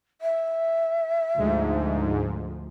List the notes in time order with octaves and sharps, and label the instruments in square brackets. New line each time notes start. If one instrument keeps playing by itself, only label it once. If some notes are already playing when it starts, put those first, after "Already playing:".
[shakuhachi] E5
[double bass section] D2 F3 [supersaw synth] G#2